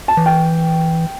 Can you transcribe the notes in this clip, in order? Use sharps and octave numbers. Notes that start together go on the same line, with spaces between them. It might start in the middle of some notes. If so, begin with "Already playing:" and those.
A5
E3
G5